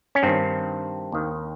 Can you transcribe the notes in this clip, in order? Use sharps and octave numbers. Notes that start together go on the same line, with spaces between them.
C#4
G2 D#3 C4
D#2 D#3